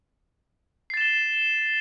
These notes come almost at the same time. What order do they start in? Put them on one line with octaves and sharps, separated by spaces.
C7 A6 E7 G7